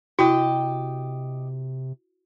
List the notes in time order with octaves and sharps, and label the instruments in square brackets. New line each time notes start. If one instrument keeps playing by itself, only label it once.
[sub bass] C3 [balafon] E4 [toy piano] F#4 [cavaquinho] G4 D#5 G5